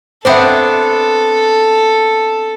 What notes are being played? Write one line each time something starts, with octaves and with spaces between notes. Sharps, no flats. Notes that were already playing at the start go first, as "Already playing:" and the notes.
B3 C4 D4 A4 C5 E5